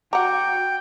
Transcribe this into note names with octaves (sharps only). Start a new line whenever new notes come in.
F#4 F#5 G5 A#5 D6